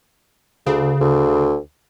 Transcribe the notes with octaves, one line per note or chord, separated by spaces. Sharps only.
D2 C#3
D2